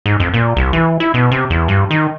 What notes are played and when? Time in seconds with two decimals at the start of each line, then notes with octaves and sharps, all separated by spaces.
0.06 G#2
0.20 F2
0.34 A#2
0.57 C2
0.73 E3
1.00 E4
1.14 B2
1.31 C3
1.50 E2
1.68 G2
1.91 D#3